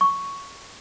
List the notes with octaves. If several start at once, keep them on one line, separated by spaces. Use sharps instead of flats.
C#6